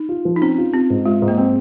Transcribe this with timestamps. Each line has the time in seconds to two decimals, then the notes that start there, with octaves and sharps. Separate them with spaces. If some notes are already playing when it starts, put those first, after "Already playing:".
Already playing: D#4
0.09 F4
0.25 F3
0.36 D#4
0.41 C4 C#4
0.58 F4
0.73 C4 F4
0.90 G#2
1.06 G#3 F4
1.22 G#2
1.28 A#3
1.38 C4